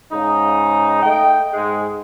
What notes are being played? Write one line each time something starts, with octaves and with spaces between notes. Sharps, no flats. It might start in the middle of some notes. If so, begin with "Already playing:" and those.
G#2 C#3 D#4
A3 D#5 G5
G#2 G#3